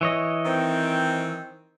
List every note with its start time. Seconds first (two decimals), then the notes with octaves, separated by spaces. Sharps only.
0.01 E3 C#5 D#5
0.46 D#3 C4